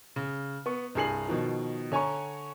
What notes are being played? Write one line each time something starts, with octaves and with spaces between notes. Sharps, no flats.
C#3
B3 C#6
C2 G2 G#4 C7 F#7
B2 D#3 F3
D3 C#5 G#5 A#5 C#6